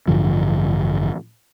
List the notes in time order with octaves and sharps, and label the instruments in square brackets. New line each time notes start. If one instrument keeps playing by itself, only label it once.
[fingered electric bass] A1 G2 D3 F3